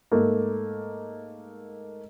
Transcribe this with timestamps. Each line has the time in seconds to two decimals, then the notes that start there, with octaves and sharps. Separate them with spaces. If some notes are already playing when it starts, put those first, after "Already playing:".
0.12 G#2 A3 A#3